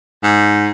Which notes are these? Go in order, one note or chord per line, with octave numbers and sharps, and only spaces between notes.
G#2